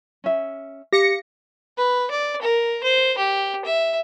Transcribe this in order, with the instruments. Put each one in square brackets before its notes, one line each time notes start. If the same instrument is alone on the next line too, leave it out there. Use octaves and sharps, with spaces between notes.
[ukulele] C#4 E5
[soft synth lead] G4 [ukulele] F5 [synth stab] A#6 C#7
[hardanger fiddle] B4
D5
A#4
C5
G4
E5